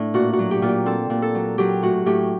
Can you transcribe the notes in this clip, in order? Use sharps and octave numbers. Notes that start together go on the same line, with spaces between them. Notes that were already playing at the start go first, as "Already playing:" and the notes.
Already playing: A2 D4
A#2 F#4
F#4
F#3
G4
A#2
G4
C4 A4
A#2
A4
F#3
F#3 G4
A2 F#4
A2 G4